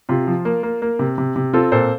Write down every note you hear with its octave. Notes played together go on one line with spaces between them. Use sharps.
C3 F4
F3
A#3
A#3
A#3
C3
C3
C3
C4 F4 A4
A#2 A4 C5